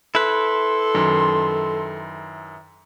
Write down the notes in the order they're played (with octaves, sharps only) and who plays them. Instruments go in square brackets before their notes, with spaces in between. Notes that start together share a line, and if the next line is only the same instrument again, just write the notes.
[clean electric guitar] E4 B4 [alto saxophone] A4 [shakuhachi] C6
[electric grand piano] F#2 D#3